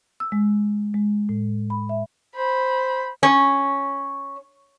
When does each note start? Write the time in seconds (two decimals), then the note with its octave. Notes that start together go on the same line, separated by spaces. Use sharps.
0.20 E6
0.32 G#3
0.94 G#3
1.29 A2
1.70 B5
1.89 E5
2.36 C5 B5
3.23 C#4